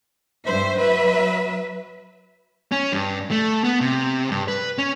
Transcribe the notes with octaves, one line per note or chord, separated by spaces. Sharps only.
G2 C5 E5
F#3 B4 E5
C#4
G2
A3
B3
C3
G2
B4
C#4